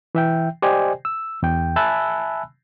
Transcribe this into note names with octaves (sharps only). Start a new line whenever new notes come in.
E3 E5 G5
G4 C5 D5 D#5 G5 G#5
E6
E2 G5
E5 G#5 A5 B5 E6 F#6